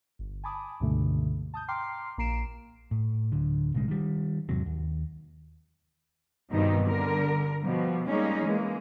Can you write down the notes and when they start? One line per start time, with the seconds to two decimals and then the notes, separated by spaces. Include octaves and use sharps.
0.19 G1
0.44 G#5 A5 B5 D6 D#6
0.80 C#2 G2 B2 D3 A3
1.54 A5 D#6 G6
1.68 G5 A#5 C6 D6 F6 C7
2.18 A#1 A#3 A#5 C7 D7 E7
2.91 A2
3.32 D1 D3
3.74 B1 A2 C#3 G#3
3.88 D#3 G3
4.49 E2 G#2 C3 F#3
4.66 D#2
6.51 G2 B2 D#3 G3 C4 D#4
6.87 D3 G3 A#4
7.62 B2 F3 G3
8.08 G3 G#3 A#3 C#4 D#4 G#4
8.43 E3 G#3 A#3